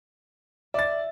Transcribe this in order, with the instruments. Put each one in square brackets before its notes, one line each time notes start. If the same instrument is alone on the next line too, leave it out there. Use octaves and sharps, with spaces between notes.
[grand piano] D5 A6 [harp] E5